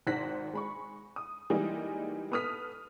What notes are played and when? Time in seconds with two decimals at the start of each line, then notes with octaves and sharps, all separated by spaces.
0.07 G#1 D#3 C5 F#6 A#6 B6
0.53 G#3 B5 C#6
1.16 D#6
1.50 E3 G3 G#3 A#3 D#4
2.32 B3 A4 D#6 F6 B6